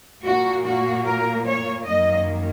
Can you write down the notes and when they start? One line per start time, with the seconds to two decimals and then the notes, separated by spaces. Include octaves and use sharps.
0.23 A#2 A#3 F#4
0.64 F#4
1.05 A#4
1.45 C#5
1.86 F#2 D#3 A#3 D#5